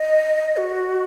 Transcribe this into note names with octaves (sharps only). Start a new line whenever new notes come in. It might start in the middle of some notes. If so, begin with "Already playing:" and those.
Already playing: D#5
F#4